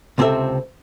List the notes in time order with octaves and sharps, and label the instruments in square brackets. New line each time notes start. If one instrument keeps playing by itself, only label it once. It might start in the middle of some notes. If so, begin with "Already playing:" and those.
[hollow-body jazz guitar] C#2 C3 C4 G#4 A4 E5